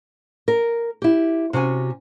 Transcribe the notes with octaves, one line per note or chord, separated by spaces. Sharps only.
A#4
E4 G4
C3 C#4 F#4 G#5